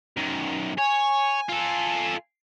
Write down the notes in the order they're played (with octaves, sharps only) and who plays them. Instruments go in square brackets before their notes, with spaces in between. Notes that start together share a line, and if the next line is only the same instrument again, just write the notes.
[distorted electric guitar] F#2 D#3
[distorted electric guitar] C#5 [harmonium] G#5
[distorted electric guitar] F4 A4